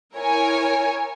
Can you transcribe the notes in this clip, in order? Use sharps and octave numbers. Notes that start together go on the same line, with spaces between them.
E4 A#4 C#5 G#5